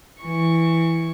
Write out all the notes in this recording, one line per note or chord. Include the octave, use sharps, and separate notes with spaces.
E3 C#6